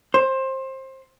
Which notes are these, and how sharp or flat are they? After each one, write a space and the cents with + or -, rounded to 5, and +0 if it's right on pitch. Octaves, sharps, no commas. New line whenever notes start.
C5 +20